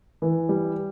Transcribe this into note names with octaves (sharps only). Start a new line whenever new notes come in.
E3
G3